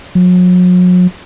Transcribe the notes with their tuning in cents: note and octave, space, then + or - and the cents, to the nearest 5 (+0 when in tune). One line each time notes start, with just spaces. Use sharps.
F#3 -40